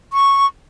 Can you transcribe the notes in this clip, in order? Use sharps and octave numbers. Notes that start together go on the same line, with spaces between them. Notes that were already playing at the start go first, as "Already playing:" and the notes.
C#6